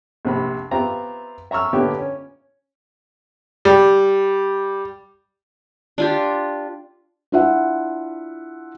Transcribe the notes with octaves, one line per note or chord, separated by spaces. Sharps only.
A#1 C3 B5
B3 C4 F4 G4 E5 A#5
E5 A#5 C#6 E6 F6
A#2 D3 B3 C#4 G4 E5
C#4
G3
D4 F4 G4
D4 E4 F4 E5 F#5